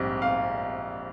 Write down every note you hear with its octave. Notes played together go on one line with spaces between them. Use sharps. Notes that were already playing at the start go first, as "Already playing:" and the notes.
Already playing: A#1 G#2 G3 C4
F5